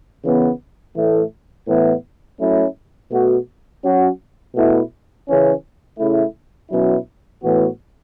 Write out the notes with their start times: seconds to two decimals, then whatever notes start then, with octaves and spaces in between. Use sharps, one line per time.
0.23 C#3 E3 B3
0.96 A2 E3 A3
1.67 A2 E3 B3 E4
2.39 F#3 A3 C#4 E4
3.11 B2 A3 F#4
3.83 F#3 C#4 F#4
4.55 B2 A3 E4
5.27 C#3 E3 C#4
5.99 C#3 A3 E4
6.70 B2 F#3 C#4 E4
7.42 A2 E3 B3 F#4